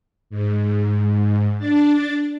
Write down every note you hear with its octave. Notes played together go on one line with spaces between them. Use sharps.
G#2
D4 A6